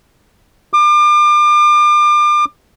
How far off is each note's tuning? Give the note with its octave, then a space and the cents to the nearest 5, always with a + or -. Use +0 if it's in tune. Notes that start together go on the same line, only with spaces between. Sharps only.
D6 +35